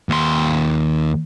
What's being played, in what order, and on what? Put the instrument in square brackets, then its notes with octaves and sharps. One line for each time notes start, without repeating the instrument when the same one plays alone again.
[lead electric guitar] D#2 C6